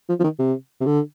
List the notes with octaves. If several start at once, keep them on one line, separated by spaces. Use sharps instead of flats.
F3
F3
D#3
C3
C3
D3